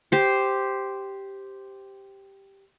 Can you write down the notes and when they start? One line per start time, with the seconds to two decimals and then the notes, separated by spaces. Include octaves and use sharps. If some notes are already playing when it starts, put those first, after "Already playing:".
0.12 G4 C5